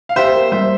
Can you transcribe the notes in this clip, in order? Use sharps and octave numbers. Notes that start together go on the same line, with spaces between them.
F5
G4 C5 E5
A#3
G3 C5 E5